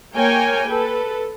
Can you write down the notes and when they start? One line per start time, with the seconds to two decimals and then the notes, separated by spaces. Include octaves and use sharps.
0.15 A#3 A#4 C#5 G5 G#5
0.67 A4 B4